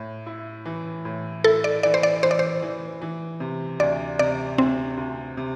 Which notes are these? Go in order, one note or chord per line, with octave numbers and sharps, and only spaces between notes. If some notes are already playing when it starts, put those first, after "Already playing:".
Already playing: A2
E4
E3
A2
E4 A4
D5
E3 D5
C5
D5
E3 C5
D5
C5
E3
E3
C3
D2 D5
C3 D5
D2 C4
D2
C3